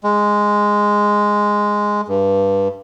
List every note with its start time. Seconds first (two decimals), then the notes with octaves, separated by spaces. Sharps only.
0.04 G#3
2.08 G2